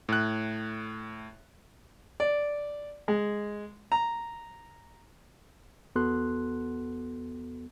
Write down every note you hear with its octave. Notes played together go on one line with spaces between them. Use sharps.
A2 F#6
D5
G#3
A#5
E2 B3 F#4 A4 C6 F#6